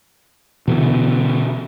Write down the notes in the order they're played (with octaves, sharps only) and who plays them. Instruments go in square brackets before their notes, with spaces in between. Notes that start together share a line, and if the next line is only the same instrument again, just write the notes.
[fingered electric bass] B2 D3 E3 B3